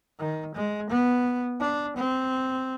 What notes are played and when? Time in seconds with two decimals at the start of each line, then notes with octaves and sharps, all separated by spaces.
0.19 D#3
0.55 G#3
0.89 B3
1.60 D4
1.97 C4